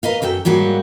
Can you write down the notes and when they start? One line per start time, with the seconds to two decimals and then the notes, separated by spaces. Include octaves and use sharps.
0.03 A#4 B4 D#5 F5
0.22 F#2 F#3 A4 G5
0.45 G#2 F#3 G3 A#3 F#4